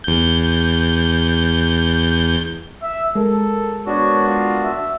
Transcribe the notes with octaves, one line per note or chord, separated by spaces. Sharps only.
E2 G6
E5
G#3 A4 A#4
B3 D4 F#4 C#5
F4
E5